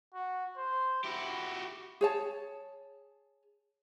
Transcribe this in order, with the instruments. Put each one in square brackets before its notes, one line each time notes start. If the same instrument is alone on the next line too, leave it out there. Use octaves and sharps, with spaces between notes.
[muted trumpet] F#4
C5
[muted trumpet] E4 [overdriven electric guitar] F#4 G4
[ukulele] G#4 C#5 A5